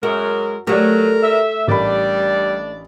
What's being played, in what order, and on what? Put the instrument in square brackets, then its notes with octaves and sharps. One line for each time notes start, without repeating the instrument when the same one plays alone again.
[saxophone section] F#2 A#4 [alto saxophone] G#3 [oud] F#4
[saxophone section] F#3 [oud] A3 A4 [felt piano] G4 D5 [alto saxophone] A#4
[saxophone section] E5
[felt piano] A1 A#4 B5 [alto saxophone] G3 [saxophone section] D4 D5